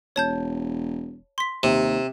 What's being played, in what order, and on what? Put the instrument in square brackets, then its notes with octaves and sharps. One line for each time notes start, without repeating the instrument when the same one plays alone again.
[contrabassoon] E1 [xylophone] C#5 A5 G6
[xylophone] C6 B6
[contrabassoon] D#2 [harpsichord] C3